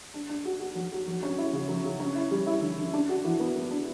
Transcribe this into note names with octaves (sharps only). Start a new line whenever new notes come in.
D4
D4
F#4
F#4
F#3
F#4
F#3
C#4
E4
C#3
F#3
C#3
C#4
E4
G3
E4
D3
D3
D4
F#4
E3
B3
B3
D4